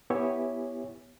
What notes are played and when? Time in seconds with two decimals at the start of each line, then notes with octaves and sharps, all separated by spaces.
0.10 B3 E4 G4 C#5 E5 G#5